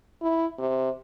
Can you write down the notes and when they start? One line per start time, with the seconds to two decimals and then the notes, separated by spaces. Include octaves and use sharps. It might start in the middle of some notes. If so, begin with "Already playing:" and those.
0.22 E4
0.59 C3